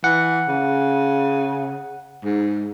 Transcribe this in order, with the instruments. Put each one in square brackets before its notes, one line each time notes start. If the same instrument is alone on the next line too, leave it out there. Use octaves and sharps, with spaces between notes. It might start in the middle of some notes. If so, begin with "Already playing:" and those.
[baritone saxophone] E3 [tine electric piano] F#5
[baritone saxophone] C#3
G#2